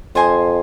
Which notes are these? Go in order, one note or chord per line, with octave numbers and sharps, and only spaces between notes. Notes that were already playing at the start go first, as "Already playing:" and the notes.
F2 C5 D#5 G#5 C6